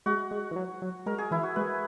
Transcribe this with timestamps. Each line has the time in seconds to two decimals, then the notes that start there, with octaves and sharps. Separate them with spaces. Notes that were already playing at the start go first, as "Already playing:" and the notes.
0.06 G#3 F#4
0.31 G#3
0.51 E3
0.56 F#3
0.82 F#3
1.06 G#3 A#4
1.18 G#4
1.31 E3 E4
1.43 F#4
1.56 G#3 B4